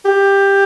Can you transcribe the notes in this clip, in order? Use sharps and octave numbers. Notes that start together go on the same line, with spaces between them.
G4